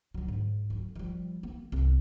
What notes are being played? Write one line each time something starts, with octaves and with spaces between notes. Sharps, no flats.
D3 F#3
G#2
D3 F#3
F3 G3
A#3
C2